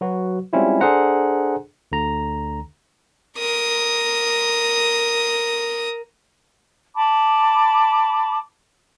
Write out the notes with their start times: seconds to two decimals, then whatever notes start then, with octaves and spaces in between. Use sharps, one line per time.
0.01 F#3 F#4 B4
0.53 G3 G#3 C4 C#4 E4 F4
0.81 D4 G#4 A4 C5 F#5 A#5
1.92 D2 D3 A#5
3.38 A#4 D#6
6.95 A5 B5 D6